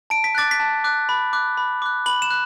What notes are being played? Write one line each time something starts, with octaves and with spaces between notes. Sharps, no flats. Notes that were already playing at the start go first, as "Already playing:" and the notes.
A5 D7
B6
D6 F#6 A6
B6
A5
D6 F#6
B5
D6 F#6
B5
D6 F#6
B5 F#7
E7
F#6